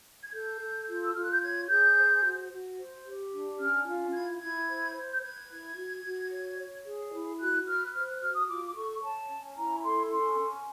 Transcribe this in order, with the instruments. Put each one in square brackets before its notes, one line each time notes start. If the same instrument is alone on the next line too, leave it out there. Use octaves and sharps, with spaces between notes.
[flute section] G#6
A4 G6
A4
F4
E6
F4 F6
F#6
G6
C#5 G#6
G#4 G6
C5
F#4
F#4
C5
G4
D4
C#4 F6
F4
E4 G#6
E4 G#6
C5
C5
G6
B4 G#6
E4
F#4
F#4
C#5
C#5
G#4
E4
F#4 F#6
B4 F6
F#6
C5 F6
F#6
F#4 F6
D#6
F4 D6
D6
A4 C#6
C#5 A5
C#4
E4 A#5
A4 C6
C#4 C6
C#4